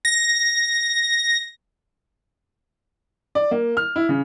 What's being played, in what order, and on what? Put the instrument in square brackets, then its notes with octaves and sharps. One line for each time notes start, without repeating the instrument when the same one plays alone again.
[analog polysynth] A#6
[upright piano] D5
A#3
F6
E4
C#3